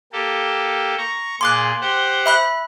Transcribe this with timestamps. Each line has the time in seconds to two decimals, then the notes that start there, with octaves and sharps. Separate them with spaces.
0.12 A#3 G4 A4
0.98 A#5 C#6
1.41 A#2 G#4 C6 D6 F#6
1.81 G4 C5 F#5
2.26 E5 B5 F#6